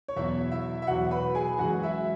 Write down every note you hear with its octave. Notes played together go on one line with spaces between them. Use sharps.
C#5
E2 B2 F#3 E4 E5
E4 E5
E5
E2 B2 F#3 F#4 F#5
B4 B5
G#4 G#5
F#2 E3 G#3 F#4 F#5
E4 E5